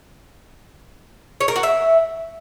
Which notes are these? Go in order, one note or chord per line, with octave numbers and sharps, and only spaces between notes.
C#5
A#4
F#4
E5